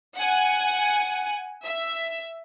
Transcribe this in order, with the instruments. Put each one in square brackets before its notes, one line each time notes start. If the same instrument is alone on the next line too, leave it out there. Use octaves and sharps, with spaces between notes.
[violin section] F#5 G#5
E5